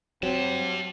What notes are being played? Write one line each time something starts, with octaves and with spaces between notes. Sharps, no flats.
F#3 C4 G4 A5